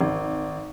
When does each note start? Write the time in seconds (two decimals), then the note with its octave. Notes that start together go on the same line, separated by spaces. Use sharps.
0.01 G#1